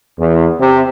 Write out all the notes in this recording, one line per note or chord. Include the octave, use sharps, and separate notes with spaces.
E2
C3